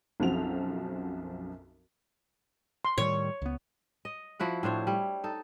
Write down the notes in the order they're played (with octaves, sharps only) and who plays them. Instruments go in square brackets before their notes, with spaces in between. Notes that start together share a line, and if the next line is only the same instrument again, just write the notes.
[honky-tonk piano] B1 F#2 F3 C4 F#4 F7
[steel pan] C6
[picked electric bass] A2 D#3 G3 [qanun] C#5
[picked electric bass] C#2 B3
[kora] D#5
F3 E4 F#4 F#5
A2 D4 C5 C#5
G3
D#4 A4